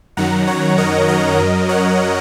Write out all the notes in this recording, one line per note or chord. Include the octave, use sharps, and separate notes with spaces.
F#2 D#3 F#3 F#5 A#5
C#5 F#5
A#4 D#5
A#4 D#5
F#2 F#3
C#5 F#5